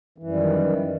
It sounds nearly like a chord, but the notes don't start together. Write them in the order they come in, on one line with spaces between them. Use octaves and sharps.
E3 F#2 G3 D#3